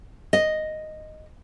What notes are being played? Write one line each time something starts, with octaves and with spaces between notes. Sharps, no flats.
D#5